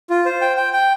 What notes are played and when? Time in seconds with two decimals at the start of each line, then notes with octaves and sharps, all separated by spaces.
0.10 F4
0.26 C5
0.42 G5
0.57 G5
0.73 G5